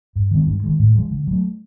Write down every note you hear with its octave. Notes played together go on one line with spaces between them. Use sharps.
G2
D#3 G#3 C4
G2
D#3 G#3
A2
F3 G#3
D3
F#3 A3